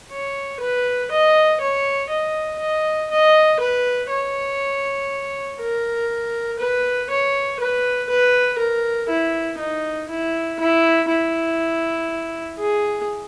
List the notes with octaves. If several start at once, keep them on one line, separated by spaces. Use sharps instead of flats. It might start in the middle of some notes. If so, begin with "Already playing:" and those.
C#5
B4
D#5
C#5
D#5
D#5
D#5
B4
C#5
A#4
B4
C#5
B4
B4
A#4
E4
D#4
E4
E4
E4
G#4